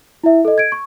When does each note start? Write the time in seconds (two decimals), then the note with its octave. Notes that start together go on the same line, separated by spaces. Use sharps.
0.24 E4 E5
0.45 A4 D#5
0.58 G#6 D7
0.72 C#6